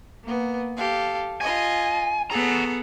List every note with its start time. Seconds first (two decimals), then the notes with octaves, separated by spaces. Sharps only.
0.24 A#3 B3
0.77 G4 A4 F5
1.41 F4 D#5 G#5
2.30 B3 G#4 A4 F#5 A#5